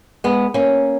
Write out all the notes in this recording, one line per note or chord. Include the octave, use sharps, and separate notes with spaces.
G#3 B3
A#3 C#4